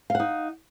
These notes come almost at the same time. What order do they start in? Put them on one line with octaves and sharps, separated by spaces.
F5 F#5 D#4